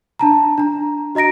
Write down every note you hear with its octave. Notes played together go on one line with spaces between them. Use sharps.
D4 A5 A#5
D4 A#5
F#4 D#5 A#5 A#6 D7